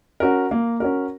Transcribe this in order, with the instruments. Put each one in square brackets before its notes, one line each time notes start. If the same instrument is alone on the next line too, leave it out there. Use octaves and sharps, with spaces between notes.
[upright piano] C#4 F#4 A#4
A#3
C#4 F#4 A#4